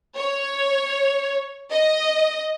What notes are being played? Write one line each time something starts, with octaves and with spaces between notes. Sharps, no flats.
C#5
D#5